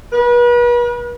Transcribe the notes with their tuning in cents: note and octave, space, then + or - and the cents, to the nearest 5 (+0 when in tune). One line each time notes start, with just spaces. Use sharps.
B4 -40